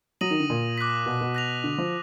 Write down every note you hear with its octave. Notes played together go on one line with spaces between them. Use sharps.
F#3 D#6 A#6 D#7 F#7
D#3
D3
A#2
D6 F#6 B6
B2
B2
F#6 A#6 F7
D3
F3